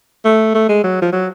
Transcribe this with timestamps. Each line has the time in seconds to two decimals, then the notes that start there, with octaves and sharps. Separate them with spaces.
0.25 A3
0.54 A3
0.69 G#3
0.84 F#3
1.02 F3
1.12 F#3